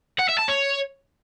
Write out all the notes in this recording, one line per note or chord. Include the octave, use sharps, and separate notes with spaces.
F#5
E5
A5
C#5